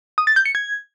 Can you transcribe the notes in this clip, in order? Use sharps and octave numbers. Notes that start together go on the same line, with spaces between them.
D#6
A6
G6
C#7
G#6